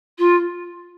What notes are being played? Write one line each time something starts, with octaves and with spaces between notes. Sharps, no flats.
F4